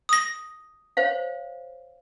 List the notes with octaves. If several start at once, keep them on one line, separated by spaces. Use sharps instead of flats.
D#6 A#6
C5 C#5 F5